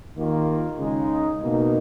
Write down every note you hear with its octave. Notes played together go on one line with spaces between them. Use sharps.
D#2 D#3 A#3 F4
C#3 G#3 D#4
B2 A#3 D#4